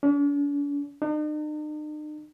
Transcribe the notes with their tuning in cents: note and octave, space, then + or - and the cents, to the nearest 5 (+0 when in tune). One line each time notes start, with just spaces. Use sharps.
D4 -45
D#4 -45